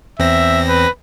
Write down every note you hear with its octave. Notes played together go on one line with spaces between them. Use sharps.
E2 C4 E5 A#6
B4